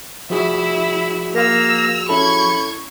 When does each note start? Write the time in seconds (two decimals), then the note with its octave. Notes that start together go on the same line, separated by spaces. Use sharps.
0.30 F3 E4 F#4 G#4 E5
1.35 A#3 A#4 F5 E6 F7
2.09 C#4 E4 A4 B5 C#6 G#6